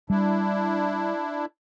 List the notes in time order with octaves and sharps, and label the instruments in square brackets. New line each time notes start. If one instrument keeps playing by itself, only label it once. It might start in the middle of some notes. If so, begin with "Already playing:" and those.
[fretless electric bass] G3 [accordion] D4 E4